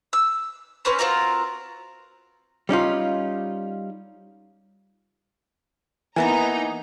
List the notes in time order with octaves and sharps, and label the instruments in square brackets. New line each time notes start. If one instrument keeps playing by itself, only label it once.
[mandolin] E6
C4 C#4 B4 C6
C4 F4 F#4 A#4
[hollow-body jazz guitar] G3 C#4 D#4 F4
[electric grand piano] E3 [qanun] A#3 B3 B4 [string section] D#4 A#5 [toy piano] E5 G#5